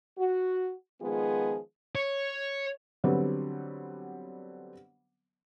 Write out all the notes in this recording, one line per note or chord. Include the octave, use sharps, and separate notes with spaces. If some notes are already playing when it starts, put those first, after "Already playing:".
F#4
D#3 F3 G#3 B3 F4 G#4
C#5
D3 F#3 G3 B3 C4